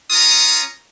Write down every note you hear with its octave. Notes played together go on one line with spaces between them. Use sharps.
C#4 F4 A#5 D#6